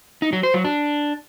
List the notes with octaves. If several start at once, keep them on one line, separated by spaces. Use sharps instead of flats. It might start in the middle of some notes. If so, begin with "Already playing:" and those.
D#4
F#3
C5
F#3
D4